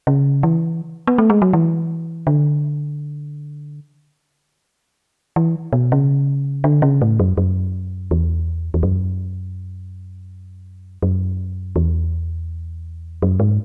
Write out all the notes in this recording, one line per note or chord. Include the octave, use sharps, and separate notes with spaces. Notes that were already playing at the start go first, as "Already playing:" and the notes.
C#3
E3
B3
A3
G#3
F#3
E3
D3
E3
B2
C#3
D3
C#3
A2
F#2
F#2
E2
E2
F#2
F#2
E2
F#2
G#2